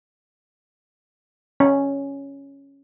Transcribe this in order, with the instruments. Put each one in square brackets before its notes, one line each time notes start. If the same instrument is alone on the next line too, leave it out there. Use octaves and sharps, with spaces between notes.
[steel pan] C#4